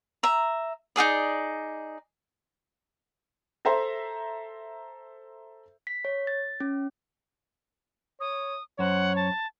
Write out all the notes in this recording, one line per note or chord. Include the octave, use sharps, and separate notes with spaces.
E5 A#5
D#4 F#4 G#4 D5
A4 C5 E5 A#5 C6
B6
C#5
A6
C#4
C#5 D#6
F#2 C5 C#5 F#5
A5